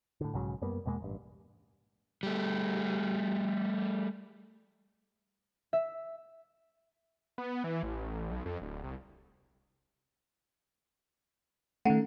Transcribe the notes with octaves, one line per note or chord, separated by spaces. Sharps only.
A2 D3
B1 G#2 C#3 F#3
F#2 G3 A#3 B3
E2 B2 G#3 A#3
A1 G2
G3 A3
E5
B3
E3
A1
B1
F2
D1
C2
D#3 A3 C#4 F#5